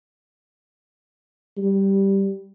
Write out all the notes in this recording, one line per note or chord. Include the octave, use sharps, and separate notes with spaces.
G3